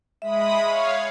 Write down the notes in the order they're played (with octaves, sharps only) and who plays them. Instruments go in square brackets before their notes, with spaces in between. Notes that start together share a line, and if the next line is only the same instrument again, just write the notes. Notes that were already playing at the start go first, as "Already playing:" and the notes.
[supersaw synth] G#3 B5 D#6 [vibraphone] E5
[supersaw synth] C#5 F5